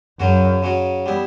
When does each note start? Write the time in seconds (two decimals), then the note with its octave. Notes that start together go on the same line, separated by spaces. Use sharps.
0.19 F#2 C#3 F#3 C#4 F#4
0.63 C#3 F#3 C#4 F#4
1.06 G3 B3 E4